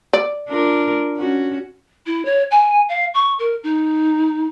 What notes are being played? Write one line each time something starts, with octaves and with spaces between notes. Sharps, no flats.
D5
D4 F4 A#4
C#4 F#4
E4
C#5
G#5
F5
C#6
A#4
D#4